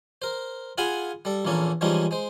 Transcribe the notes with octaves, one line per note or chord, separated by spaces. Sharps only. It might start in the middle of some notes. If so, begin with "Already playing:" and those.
A#4 C5
F4 G#4 F5 F#5 G#5 B5
G3 A4
A#1 E2 A#3 C#4 A4
E3 F3 G3 G#3 C#4 D#4
G#3 C5